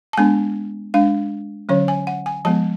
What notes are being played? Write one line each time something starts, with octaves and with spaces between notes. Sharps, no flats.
A5
G#3 B3 D4 G#5
G#3 D4 F5
D3 F#3 C#4 C#5
G#5
F#5
G#5
F3 G#3 B3 A5